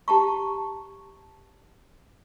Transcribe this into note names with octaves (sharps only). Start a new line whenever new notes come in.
G4 A5 A#5 C#6